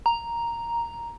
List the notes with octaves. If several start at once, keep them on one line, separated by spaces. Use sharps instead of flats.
A#5